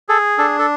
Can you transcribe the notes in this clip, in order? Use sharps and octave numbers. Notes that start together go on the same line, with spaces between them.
G#4 A4
D4 A4
A4